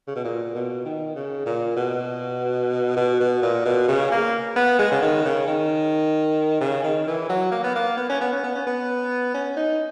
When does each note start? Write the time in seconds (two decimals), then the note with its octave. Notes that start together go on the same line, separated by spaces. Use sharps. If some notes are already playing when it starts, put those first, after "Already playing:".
0.07 C#3
0.16 B2
0.24 A#2
0.55 B2
0.85 D#3
1.15 C#3
1.46 A#2
1.76 B2
2.97 B2
3.20 B2
3.42 A#2
3.65 B2
3.88 C#3
4.11 A#3
4.56 B3
4.79 G#3
4.92 C#3
5.02 D#3
5.25 C#3
5.47 D#3
6.61 C#3
6.83 D#3
7.07 E3
7.29 F#3
7.51 A#3
7.64 B3
7.76 A#3
7.97 B3
8.09 C#4
8.21 B3
8.32 C#4
8.44 B3
8.55 C#4
8.67 B3
9.34 C#4
9.56 D#4